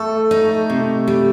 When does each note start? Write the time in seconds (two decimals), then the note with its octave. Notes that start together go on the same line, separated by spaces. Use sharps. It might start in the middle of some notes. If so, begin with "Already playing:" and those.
Already playing: A3 A4
0.31 D#4
0.70 C3
1.08 G3